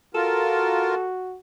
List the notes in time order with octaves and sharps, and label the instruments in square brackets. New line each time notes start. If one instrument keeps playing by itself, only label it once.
[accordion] F4 A#4 [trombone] F#4 [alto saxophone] A4